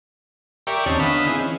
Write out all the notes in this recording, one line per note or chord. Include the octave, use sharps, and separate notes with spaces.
G4 A#4 D5 E5 G5 C#6
D#2 C4 C#4 D#4 C#5 A5
D3 B3 D#5 F5 B5 E6
B3 C4 D#4 E4 G#4
E3 C#4